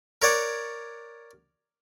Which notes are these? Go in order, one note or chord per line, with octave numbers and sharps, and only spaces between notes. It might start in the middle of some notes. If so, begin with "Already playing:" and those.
A#4 C#5 D5 F#5